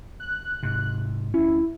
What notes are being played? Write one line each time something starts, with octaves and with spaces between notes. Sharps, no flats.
F#6
G#2 C3
D2 C#4 E4